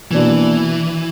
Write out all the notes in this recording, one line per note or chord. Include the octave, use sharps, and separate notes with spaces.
B2 E3 A#3 D4 F#4